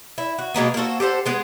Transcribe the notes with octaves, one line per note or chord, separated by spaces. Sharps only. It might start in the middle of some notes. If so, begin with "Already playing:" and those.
E4
F#4
B2 G#3 A#3 B3
A#3 C4 F#4 A4
G4 A4 C5 F#5
G#3 B3 G#4